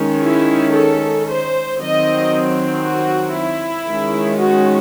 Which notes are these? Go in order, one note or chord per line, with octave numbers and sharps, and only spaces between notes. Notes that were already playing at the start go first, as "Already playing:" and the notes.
Already playing: D#3 G#3 C#4
E4
A4
C5
D#3 F#3 C4 D#5
F#4
E4
D#3 G#3 C#4
F#4